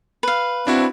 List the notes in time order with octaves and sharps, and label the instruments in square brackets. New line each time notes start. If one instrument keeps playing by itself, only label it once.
[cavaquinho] B4 F5
[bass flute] C4 [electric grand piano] D4 E4 F#4